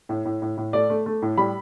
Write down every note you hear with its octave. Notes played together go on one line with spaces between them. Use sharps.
A2
A2
A2
A2
A3 D5
A3
A3
A2
G3 B5